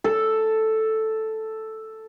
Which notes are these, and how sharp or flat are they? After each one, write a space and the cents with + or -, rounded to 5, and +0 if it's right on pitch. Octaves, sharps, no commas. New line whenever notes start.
A4 +0